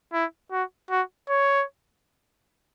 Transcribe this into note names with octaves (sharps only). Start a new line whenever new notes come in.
E4
F#4
F#4
C#5